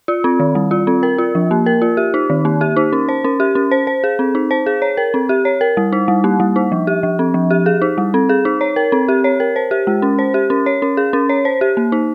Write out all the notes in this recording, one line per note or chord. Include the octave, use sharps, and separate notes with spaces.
F4
C4
D#3
G3
F4
C4
A#4
F4
F3
A#3
A#4
F4
G4
D#4
D#3
A#3
G4
D#4
C#4
C5
C#4
G4
C#4
C5
C5
G#4
C4
D#4
C5
G#4
C#5
A#4
C4
G4
C#5
A#4
G3
D#4
G3
A#3
G3
D#4
F3
G4
F3
C4
F3
G4
G#4
D#4
G3
C4
G#4
D#4
C#5
A#4
C4
G4
C#5
A#4
C5
G4
G#3
C#4
C5
G4
C#4
C#5
C#4
G#4
C#4
C#5
C5
G4
A#3
D#4